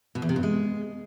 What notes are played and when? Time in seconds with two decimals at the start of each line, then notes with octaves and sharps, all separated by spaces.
0.15 B2
0.22 E2
0.29 C3
0.36 G2
0.43 G#3